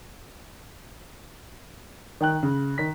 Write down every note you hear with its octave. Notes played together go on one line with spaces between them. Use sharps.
D#3 G5 F#6
C#3
D#3 B6